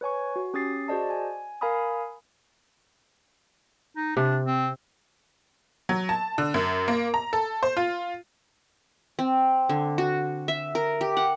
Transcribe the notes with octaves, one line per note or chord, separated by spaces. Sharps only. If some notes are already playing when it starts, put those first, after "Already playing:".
B4 C#5 G#5 C#6
F#4
C#4 G4 D#6 A6 C7
F#4 G#4 C5 D5 D#5 A5
G#5
A#4 F5 G#5 A#5 B5 D#6
D#4
C3 D4
C4
F#3
A5
D3
F#2
A#3
A#5
A4
C5
F4
C4
D3
F#4
E5
A#4
G4
F#5